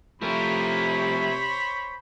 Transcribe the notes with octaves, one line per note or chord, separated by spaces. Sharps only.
C3 F3 A3 E4 A#4 C5 C#5 B5